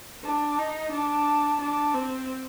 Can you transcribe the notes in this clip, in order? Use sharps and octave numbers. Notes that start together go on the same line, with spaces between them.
D4
D#4
D4
D4
C4